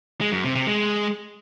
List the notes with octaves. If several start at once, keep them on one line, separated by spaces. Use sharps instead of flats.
G#3
F#2
C3
C3
G#3